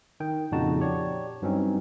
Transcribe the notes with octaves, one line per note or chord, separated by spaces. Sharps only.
D#3 G5
F2 A#2 C#3 D#4 F#4 A5
G4 C#5 D5
G2 F#3 C4 C#4 D#4